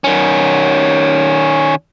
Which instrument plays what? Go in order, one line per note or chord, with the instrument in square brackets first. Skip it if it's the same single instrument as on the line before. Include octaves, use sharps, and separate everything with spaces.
[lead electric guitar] D#3 C#4